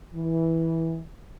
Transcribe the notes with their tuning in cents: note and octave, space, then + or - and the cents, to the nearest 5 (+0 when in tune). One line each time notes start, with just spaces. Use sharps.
E3 -10